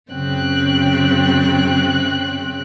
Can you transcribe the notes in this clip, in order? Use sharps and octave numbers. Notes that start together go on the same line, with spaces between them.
F#2 C#3 C4 G5 F#6